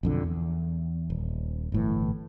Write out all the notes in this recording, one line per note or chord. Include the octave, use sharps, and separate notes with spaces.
B1 F2 D3
E2
D#1
G1 A2 E3